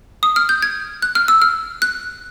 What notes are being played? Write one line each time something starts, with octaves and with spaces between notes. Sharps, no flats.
D#6
F6
G6
G#6
F#6
F6
E6
F6
F#6